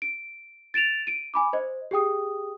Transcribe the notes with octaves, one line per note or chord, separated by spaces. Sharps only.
D7
A6 D7 E7 F7
D7 D#7
G#5 B5 D6
C5 D#5
G4 G#4 G5 D#6